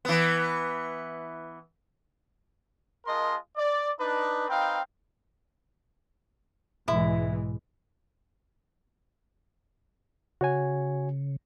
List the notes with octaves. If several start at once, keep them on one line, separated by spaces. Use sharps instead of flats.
E3 B3
G#3 F4 A#4 D#5 A5 C6
D5
D4 D#4 B4
C4 D#4 B4 F5 G5
B1 G#2 B2 E3 G#3 E4
C#3 F#4 C#5 G#5